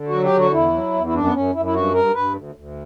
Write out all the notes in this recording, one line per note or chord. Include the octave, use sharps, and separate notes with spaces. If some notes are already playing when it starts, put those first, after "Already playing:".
Already playing: D3
F#3 F#4
G4
D3 F#4
E2 E4
F#3
E2
E4
F#2 D4
B3
F#2 C#4
F#2 E4
E4
G2 F#4
G2 A#4
G2 B4
D2
D2